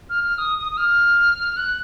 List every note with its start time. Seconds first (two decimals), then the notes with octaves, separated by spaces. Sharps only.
0.10 F6
0.24 F6
0.38 D#6
0.58 D#6
0.72 D#6
0.77 F6
1.56 F#6